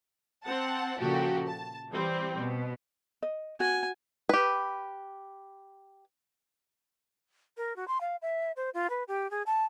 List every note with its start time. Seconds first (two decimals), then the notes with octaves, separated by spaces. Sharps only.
0.44 C4 F#5 A5
0.98 A#2 C#3 F3 F#4 G4 A4
1.47 A5
1.91 E3 G3 C4
2.39 B2
3.23 D#5
3.60 F#4 G#5
4.29 G4 B4
7.57 A#4
7.76 F#4
7.88 C6
8.01 F5
8.22 E5
8.56 C5
8.74 F4
8.90 B4
9.08 G4
9.31 G#4
9.46 A5